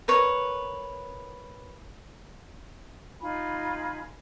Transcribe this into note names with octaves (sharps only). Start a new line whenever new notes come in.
A#4 B4 C#5
D#4 F4 G#5 B5